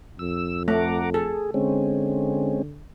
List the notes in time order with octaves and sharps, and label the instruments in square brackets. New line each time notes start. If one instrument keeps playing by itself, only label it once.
[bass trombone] F2 [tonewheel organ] E6
[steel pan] A3 [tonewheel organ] F#5 A#5 D6
[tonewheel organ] G#4 [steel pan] A4
[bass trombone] D3 [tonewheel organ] G#3 C4 C#4